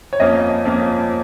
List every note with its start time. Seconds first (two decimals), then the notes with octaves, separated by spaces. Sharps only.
0.13 C#5
0.20 F2 F3 A#3 C#4 D#5
0.65 F2 F3 A#3 C#4